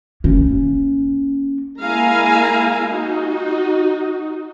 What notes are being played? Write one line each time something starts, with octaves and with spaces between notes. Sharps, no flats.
A#3 C#4
G#3 A#3 E4 F5 G#5 A#5
D#4 F#4